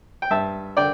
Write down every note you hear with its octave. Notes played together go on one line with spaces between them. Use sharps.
G5
G2 E5 A5
D3 D5 G5